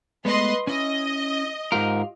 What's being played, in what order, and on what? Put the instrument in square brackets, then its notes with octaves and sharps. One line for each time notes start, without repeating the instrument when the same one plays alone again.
[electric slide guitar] G#3 A3 B3 [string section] B4 D#5 C6
[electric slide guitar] C#4 E4 [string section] D#5
[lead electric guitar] G#2 A#4 [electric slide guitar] F4 G4 F5